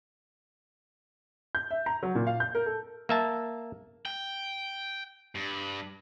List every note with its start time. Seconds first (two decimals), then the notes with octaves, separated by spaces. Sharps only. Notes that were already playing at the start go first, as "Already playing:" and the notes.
1.55 G6
1.71 E5
1.86 A#5
2.03 F#3
2.15 A#2
2.27 F5
2.40 G6
2.55 A#4
2.66 A4
3.09 A#3 E5 A5
4.06 G5
5.35 G2